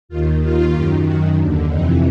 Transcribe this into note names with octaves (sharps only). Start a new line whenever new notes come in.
D#2 D#3 F4
D#2 D#3 F4
F#2 D#3 G4
F#2 D#3 F#4
D#2 D3
F2 C3 E3 D#4